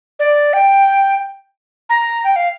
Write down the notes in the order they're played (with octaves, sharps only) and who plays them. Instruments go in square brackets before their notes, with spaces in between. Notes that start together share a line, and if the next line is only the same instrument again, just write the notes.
[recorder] D5
G5
A#5
G5
F5